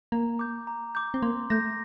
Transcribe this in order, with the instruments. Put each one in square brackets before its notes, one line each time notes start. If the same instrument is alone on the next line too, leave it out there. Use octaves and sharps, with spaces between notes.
[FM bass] A#3 [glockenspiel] A#5
[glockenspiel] D6 G6
A#5
D6 G6
[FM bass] C4
[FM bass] A#3 [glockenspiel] C6
[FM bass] A3 [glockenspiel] G6 A#6